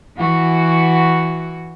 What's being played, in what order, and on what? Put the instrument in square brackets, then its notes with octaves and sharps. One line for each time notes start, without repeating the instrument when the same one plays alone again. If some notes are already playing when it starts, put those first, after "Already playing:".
[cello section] E3 F#4